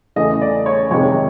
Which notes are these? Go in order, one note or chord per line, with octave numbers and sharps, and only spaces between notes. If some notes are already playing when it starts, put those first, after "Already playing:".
E2 C#3 E3 A3 D#5
D5
C#5
F2 C3 D#3 G#3 C#5